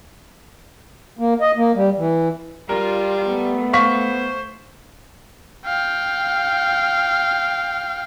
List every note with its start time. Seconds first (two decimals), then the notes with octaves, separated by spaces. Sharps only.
1.19 A#3
1.41 D#5
1.57 A#3
1.75 G3
1.98 E3
2.69 G3 F4 A#4
3.27 A3 B3
3.73 C5 F5 C#6 B6
5.66 F5 G5